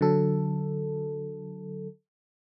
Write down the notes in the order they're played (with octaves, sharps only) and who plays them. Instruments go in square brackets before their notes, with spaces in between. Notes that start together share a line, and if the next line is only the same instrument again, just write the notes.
[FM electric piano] D3 F#3 A4